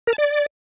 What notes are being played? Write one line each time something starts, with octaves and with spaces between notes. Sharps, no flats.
A#4
A5
D5